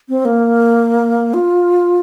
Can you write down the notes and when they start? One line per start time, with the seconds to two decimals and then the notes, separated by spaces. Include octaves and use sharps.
0.09 C4
0.25 A#3
1.34 F4